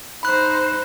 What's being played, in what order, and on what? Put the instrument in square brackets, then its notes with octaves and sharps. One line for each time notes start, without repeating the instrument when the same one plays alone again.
[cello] D#4 C5 [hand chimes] B5 F#6